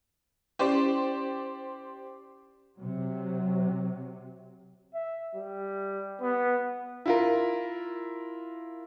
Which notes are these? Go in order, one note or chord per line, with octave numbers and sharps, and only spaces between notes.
C#4 E4 G4 C5 D5
C3 F#3
E5
G3
B3
E4 F4 A#4